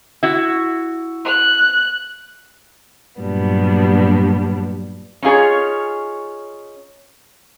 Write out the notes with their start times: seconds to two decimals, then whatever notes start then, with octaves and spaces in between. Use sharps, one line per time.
0.23 E4 F#4
1.25 F#6
3.20 G2 A#2 F#3 G3 B3 D4
5.23 C#4 D#4 F4 G#4 C#5